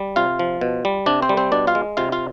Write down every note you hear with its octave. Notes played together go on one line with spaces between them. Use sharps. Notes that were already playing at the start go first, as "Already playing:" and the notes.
Already playing: G3
C3 F4 F5
F3
B2
G3
C3 D4 D5
C4 C5
G3
C4 C5
B2 D4 D5
F4 F5
G#3
C3 F4 F5
F4 F5